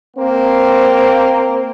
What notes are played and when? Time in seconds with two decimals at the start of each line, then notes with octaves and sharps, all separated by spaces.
0.17 A#3 C4